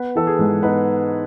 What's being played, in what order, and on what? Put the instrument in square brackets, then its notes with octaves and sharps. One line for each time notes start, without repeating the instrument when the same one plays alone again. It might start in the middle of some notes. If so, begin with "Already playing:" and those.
Already playing: [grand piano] B3 B4
E3 A4
G#4
G#2
B3 D#4 B4